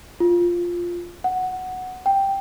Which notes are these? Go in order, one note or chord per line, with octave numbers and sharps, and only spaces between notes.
F4
F#5
G5